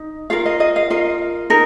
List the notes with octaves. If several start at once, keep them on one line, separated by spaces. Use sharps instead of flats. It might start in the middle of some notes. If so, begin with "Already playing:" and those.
Already playing: D#4
F4 A#4 F5
D#5
D#5
F5
F4 A#4 D#5
D#4 A#4